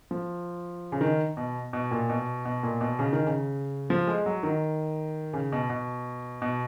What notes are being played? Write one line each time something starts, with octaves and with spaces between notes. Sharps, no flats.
F3
C#3
D#3
B2
B2
A#2
B2
B2
A#2
B2
C#3
D#3
C#3
F3
G#3
F#3
D#3
C#3
B2
B2
B2